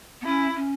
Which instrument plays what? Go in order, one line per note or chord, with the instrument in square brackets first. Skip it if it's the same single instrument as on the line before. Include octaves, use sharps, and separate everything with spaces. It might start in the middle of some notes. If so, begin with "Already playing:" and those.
[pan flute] B3
[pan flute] C#4 [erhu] E4
[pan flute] C#4